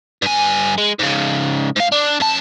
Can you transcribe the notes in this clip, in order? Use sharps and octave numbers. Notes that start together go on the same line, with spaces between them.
G2 G#5
G#3
G#2 C#3
G#2 F5
D4
F#2 A5